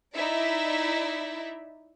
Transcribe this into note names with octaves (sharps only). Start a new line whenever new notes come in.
D#4 E4 D5 E5